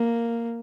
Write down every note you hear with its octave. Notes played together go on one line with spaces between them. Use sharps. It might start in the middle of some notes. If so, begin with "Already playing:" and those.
Already playing: A#3